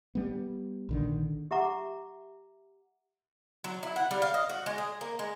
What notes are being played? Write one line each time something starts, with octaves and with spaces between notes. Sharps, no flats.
G3 B3
A#1 D3 D#3
G4 E5 F#5 A#5 D6
F#3
E4
F#5
G3
F5
D#5
F#4
G#3
G#4
A#3
G#3